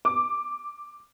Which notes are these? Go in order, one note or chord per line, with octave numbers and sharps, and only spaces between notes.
D6